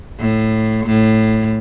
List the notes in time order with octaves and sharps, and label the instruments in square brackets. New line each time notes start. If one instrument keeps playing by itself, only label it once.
[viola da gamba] A2
A2